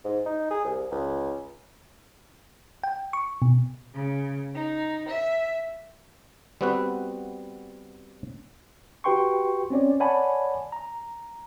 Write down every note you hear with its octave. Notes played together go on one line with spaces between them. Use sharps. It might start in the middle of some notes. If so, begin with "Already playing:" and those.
G#2
D#4
G#4
C2
C#2
G5
C#6
B2
C#3
D#4
E5
G3 B3 C4 F#4 B4
F#4 G4 B4 G5 C6 C#6
C4 C#4 C#5 D5
C#5 D5 F#5 G#5 A5 B5
A#5